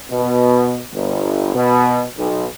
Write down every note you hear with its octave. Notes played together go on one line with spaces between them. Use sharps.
B2
G1
B2
B1